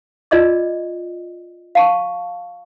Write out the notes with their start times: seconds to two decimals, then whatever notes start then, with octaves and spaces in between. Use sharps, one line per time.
0.31 F4 D5 D#5 D6
1.75 F5 A5 C#6